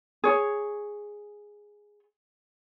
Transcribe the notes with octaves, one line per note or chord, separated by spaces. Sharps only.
G#4 C#5